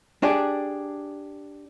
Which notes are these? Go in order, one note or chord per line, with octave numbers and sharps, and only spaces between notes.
D4 G4 G#4 D5